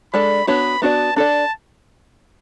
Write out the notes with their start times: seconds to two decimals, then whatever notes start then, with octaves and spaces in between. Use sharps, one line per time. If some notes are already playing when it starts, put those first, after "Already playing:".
0.13 G#3 D4 A4 D5 B5
0.47 B3 D4 F#4 C#5 B5
0.82 B3 D4 F#4 B4 D5 A5
1.16 D4 A4 D5 A5